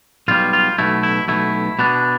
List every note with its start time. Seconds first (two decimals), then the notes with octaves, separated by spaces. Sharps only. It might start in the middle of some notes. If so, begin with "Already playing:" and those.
0.28 B1 B2 G3 F4
0.53 F4
0.78 B1 B2 A3 E4
1.03 E4
1.28 B1 B2 A3 E4
1.79 B2 B3 D4